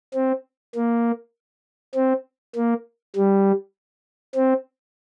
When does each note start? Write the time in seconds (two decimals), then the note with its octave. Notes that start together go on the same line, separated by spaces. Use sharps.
0.14 C4
0.75 A#3
1.95 C4
2.56 A#3
3.16 G3
4.36 C4